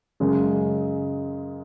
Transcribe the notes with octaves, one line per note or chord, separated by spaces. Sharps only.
F#2 C#3 G#3